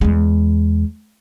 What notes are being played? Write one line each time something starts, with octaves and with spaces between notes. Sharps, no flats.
E2 G#3